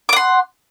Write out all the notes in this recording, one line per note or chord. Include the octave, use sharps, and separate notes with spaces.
F#5 C6 D6